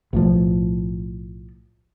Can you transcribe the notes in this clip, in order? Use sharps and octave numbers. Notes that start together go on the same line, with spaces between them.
B1 A2 F3